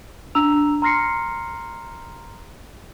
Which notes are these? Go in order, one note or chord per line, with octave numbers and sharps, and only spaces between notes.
D4 A#5 E6 F7
A#5 C6 F6 A#6 C7 C#7